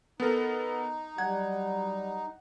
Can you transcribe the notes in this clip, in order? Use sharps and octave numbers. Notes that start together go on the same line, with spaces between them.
B3 D#4 A4 A#4
F#3 G3 F#5 G#6